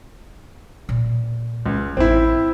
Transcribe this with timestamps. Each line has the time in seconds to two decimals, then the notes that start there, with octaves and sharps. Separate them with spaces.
0.89 A#2
1.66 C#2
1.97 A1 C4 E4